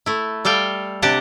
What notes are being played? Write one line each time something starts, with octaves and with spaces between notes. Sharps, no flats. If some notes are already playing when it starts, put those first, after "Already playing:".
A3 E4
G3 A4 F5 G5
C3 D4 G4 F#5 A5